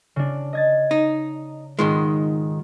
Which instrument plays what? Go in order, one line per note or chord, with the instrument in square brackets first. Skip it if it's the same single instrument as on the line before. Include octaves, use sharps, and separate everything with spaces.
[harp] C#3 D4
D#5 G#6 A6
[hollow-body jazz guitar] D#4
[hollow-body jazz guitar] G#2 D#3 G#3 [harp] F4